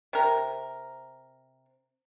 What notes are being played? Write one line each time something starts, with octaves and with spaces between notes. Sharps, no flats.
C3 A#4